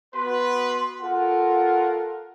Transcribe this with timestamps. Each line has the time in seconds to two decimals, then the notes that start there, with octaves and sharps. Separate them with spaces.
0.15 B3 F#4 B4 C6
1.01 F4 A4 A#4 F#5